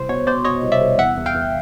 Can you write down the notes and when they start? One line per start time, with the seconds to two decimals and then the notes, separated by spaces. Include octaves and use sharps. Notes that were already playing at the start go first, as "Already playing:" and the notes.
Already playing: C2 C5
0.09 B2 C#5
0.27 B2 C5 D5
0.45 B2 C#5 D#5
0.63 C2
0.72 D5 E5
0.81 C2
0.98 E2 E5 F#5
1.17 E2
1.26 F5 G5
1.35 E2